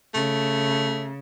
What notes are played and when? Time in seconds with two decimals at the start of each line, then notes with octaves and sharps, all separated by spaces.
0.14 C#3 A3